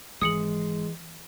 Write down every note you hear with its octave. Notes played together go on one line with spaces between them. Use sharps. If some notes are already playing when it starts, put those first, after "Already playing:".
G#1 E3 G#3 D#6 C#7 F#7